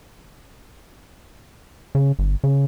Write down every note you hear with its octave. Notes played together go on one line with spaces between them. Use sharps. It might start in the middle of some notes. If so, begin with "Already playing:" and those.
C#3
G1
C#3